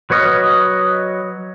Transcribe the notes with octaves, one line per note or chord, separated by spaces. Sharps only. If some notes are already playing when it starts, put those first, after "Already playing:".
F#3 B4 C#5 D#5 F6